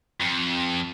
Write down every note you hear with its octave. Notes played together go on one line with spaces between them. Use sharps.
F2